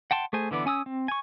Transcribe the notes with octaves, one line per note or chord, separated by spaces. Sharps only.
F#5 G5 A5 C6
A3 G#4 C5 G#5
D3 E3 B3 D5
C#4 G#5 D#6 E6
C4
G#5 C#6